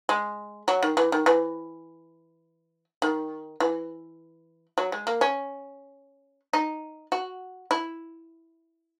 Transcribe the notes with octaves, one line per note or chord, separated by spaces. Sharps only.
G#3
F#3
D#3
E3
D#3
E3
D#3
E3
F#3
G#3
A#3
C#4
D#4
F#4
E4